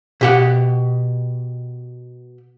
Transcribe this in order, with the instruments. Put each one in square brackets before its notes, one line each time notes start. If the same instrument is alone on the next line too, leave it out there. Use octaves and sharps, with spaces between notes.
[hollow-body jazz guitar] B2 G4 F#5